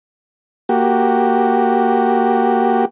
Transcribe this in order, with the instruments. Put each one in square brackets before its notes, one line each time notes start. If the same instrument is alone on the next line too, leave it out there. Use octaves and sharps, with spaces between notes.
[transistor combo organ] A#3 F#4 G4